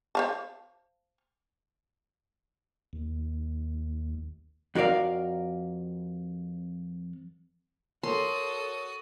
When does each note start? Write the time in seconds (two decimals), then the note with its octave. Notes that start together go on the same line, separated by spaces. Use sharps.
0.15 C5 F5 A5
2.93 D#2
4.75 F2 F#4 A#4 D5 F5
8.03 F#4 A4 A#4 C#5 C6 D#6